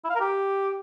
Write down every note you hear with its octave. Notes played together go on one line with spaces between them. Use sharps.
E4
F5
A#4
G4